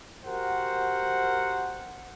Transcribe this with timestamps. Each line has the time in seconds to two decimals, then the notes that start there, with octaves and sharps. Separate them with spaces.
0.24 F#4 G4 A#4 C5 F#5